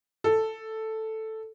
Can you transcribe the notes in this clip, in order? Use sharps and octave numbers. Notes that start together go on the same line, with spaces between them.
A4